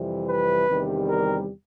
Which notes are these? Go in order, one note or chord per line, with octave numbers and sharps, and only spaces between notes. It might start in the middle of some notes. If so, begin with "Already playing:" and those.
Already playing: F2 C3 E3 G3
B4
E2 C3 D#3 G3
A#4